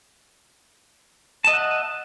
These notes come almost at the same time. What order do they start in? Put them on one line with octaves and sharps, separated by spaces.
A5 D#5 E5 F#5